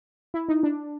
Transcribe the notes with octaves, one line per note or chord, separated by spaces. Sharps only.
E4
D#4
D4